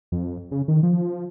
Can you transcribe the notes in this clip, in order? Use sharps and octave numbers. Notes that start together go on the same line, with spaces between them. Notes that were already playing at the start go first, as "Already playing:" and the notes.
F2
C#3
D#3
F3